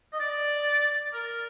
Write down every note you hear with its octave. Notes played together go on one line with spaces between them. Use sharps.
D#5
D5
A#4